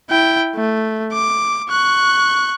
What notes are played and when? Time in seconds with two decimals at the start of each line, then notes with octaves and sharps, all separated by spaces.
0.10 E4 G5
0.55 A3
1.13 D6
1.70 C#6 F#6